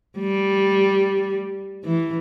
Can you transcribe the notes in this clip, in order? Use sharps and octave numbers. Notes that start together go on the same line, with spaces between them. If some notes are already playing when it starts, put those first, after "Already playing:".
G3
E3